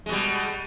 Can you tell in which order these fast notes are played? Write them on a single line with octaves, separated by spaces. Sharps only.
G#3 B2 G3